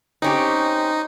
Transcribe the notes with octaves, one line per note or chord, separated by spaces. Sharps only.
C4 C#4 D#4 G4